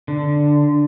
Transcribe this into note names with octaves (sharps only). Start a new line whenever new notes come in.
D3